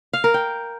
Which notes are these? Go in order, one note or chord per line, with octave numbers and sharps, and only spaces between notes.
F5
A#4
G5